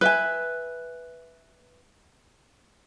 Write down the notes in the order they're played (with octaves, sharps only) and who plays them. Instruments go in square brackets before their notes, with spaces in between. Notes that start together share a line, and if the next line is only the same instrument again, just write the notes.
[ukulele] B4 E5 G#5